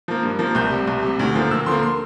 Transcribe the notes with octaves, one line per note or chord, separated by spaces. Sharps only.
F3 A#3
G2
F3 A#3
C2 G6
C3 G3
C2
C3 G3
D2
D3 F3 A#3
D2 E6
D3 F3 A#3 C6
C6